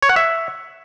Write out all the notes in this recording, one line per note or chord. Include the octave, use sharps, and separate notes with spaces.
C#5
F#5
E5